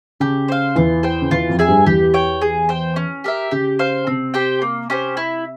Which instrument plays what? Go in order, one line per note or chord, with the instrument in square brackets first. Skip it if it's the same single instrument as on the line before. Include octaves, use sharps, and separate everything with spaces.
[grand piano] C#3 [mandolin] G4
[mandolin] C5 F5
[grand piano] E2 E3 [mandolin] F4
[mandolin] C5 G5
[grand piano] C#3
[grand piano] E2 E3 [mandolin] F4
[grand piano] F2 F3
[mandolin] G#4 E5 G#5
[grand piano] G2 G3
[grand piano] E2 E3 [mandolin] G4
[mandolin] C#5 G5
G#4
C5 G5
C#4
G4 A#4 E5
[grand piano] C#3 [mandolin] G4
[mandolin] C5 F5
[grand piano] C3 [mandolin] C4
[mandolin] G4 C5 G5
A#3
C#4 G4 C5
E4